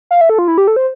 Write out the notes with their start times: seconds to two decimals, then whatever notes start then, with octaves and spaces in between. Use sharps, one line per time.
0.11 F5
0.21 E5
0.29 A4
0.39 F4
0.48 E4
0.58 G4
0.67 A4
0.76 C5